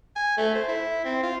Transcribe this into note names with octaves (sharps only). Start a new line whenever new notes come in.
G#5
A3
C5
E4
C4
F4